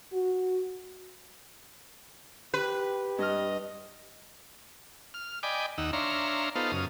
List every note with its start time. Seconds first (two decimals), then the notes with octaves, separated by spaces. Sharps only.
0.13 F#4
2.54 G4 B4
3.18 G2 D#5 F6
5.14 F6
5.43 D5 D#5 G5 G#5 B5 D6
5.78 D#2 D#4 F#5 E6
5.93 D4 C#5 E5 F5 A#5 C6
6.56 B3 D#4 F4 A4 C5 F5
6.72 F#2 C#3 F5 D#6